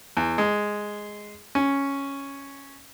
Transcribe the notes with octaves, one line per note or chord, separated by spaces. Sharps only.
E2
G#3
C#4